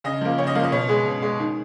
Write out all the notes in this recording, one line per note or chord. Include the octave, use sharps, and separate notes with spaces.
C#3 D#5
F3 A#3
C#3 C#5
D#5
F3 A#3 F5
D#5
B2 C#5
G#3 G#4
B2
G#3
D#3